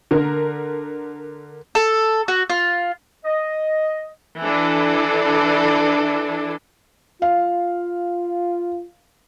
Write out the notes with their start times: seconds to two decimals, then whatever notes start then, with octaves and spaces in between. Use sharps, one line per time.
0.11 D3 A#4
1.75 A4
2.28 F#4
2.50 F4
3.25 D#5
4.41 E3 D4 A4
7.22 F4 F5